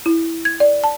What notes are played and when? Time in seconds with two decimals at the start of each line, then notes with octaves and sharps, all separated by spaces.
0.06 E4
0.45 G#6
0.60 D5
0.84 A5